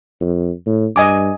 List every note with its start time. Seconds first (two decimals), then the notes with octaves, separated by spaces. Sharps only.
0.21 F2
0.66 A2
0.96 G2 D#5 G#5 D6